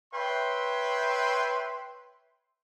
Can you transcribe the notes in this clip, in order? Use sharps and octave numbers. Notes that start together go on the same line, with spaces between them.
B4 C#5 E5 G5 C6